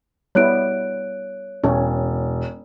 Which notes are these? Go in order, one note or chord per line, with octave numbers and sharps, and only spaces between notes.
G3 B3 E4 C#5 F#6 D7
E1 C#4